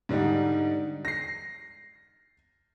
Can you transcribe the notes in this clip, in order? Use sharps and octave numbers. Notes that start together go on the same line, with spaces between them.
G#2 D3 G3 D#4
A#6 C7